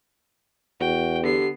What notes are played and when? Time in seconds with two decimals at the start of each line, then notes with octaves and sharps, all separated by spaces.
0.80 E2 F#4 G5
1.23 D3 B3 G4 C7